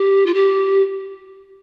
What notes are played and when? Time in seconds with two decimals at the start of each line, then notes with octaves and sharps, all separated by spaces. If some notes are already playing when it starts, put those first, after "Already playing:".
Already playing: G4
0.26 F4
0.34 G4